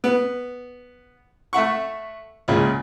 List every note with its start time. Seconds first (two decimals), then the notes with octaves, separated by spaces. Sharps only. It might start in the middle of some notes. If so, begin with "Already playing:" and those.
0.04 B3
1.53 A3 E5 F#5 C#6
2.48 C#2 A#2 C#3